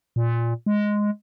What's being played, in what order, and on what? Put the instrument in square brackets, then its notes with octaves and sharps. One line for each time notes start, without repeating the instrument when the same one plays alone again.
[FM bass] A#2
G#3